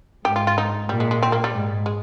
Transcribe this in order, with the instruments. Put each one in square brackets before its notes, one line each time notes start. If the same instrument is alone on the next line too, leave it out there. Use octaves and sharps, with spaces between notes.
[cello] G#2 [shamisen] G4
[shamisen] F4
F4
D#4
[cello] A#2 [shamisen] G3
[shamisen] G#3
G#3
C4
A#3
G3
[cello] G#2
[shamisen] G#3